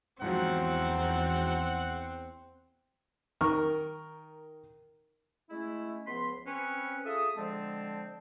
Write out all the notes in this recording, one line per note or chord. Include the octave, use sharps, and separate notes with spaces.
E2 G#2 F3 F#3 C4 F#5
D#3 A#4 C#6 F6
G#3 A3 C#4 E4
C#2 F3 B3 B5 C6
C4 C#4 B4
F4 G#4 A4 E5 D#6
D3 F3 G#3 C4 A5